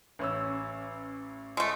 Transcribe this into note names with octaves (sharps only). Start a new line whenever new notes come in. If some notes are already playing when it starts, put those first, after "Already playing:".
A1 C#4 E6
G#3 A3